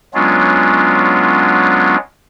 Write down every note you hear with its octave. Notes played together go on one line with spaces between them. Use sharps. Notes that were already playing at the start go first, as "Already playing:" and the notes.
F#3 G#3 B3 C#4 D4 F4